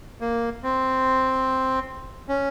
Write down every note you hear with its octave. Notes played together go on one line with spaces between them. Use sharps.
A#3
C4
C#4